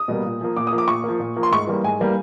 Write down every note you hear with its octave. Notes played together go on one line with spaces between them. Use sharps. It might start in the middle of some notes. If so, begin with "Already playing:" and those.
Already playing: D#6
B2 G3 A#3
A#2
F3 A#3
A#2 D6
D#6
F3 A#3
D6
A#2 C#6
A#3
F3
A#2
F3 A#3
C6
G#2 C#6
E3 G3 A#3
G#2 G#5
E3 G3 A#3